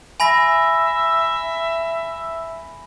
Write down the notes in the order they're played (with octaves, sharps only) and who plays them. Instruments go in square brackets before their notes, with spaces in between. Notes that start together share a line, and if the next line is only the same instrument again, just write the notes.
[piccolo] E5 [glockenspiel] G#5 B5 A#6